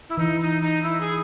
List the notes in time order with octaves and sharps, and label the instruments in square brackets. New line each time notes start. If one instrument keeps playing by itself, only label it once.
[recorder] E4
[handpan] E3 [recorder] D#4
[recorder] D#4
D#4
E4
G#4